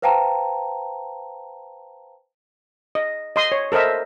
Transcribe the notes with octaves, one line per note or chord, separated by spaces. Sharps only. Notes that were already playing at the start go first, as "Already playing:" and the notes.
B4 C5 F5 G5 A5 A#5
D#5
D#5 C6 D#6
C#5
A4 A#4 C5 D#5 E5